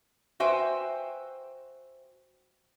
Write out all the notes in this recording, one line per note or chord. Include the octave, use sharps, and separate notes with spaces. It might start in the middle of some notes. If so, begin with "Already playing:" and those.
F#4 B4 C5 E5 G5 G#5